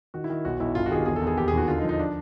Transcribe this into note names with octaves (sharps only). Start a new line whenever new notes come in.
D#3 F#4
E4
D#3
B1 F#4
B1 E4
G1 F4
F#4
D#3 G4 G#4
E2 G#4
A4
E2
G#4
D#2 G4
G#4
D#2 F#4
D3 F4
D#4
F3
D#4
D4